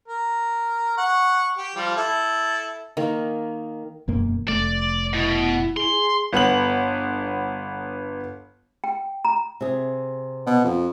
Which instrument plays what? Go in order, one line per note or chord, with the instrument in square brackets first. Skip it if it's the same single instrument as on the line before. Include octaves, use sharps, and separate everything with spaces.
[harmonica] A#4
F#5 C#6
G4
F3 G3
E4 A4
[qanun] D#3 A#3
[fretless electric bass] E1 F#2 A#3
[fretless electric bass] F1 A3 [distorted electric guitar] D5
[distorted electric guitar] B2 [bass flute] E4
[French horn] G#4 [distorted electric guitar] C6
[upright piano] G1 B3 F#5 B5 F#7
[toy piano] G5
A#5
[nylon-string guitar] C3 G#4
[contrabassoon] B2
F2